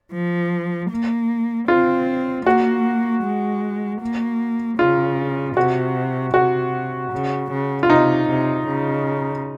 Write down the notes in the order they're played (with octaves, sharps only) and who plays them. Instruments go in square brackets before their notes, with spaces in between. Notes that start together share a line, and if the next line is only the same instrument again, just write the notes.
[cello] F3
A#3
[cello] C4 [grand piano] F4
[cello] A#3 [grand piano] F#4
[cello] G#3
A#3
[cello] C#3 [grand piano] F4
[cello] C3 [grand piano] F#4
[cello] C3 [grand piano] F#4
[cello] C#3
C#3
[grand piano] F4
[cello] C3 [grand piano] D#4
[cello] C3
C#3